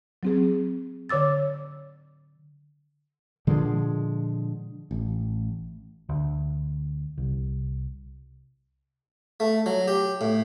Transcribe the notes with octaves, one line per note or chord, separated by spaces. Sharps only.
F#3 C4 G#4
D3 C#5 D6 E6 A6
A#2 D3 F3 G#3
A1
D2
C2
A3
F#3
G4
A2